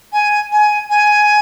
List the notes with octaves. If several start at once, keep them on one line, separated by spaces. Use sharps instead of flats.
G#5
G#5
G#5